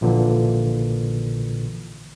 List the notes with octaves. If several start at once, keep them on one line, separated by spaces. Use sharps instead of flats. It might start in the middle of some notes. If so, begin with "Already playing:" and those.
A#1 A#2 D3 E3